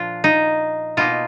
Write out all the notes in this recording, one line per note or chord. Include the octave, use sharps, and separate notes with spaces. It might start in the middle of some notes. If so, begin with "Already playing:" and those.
Already playing: A#2 F3 D4 F4
D#4
B2 A#3 D#4 F4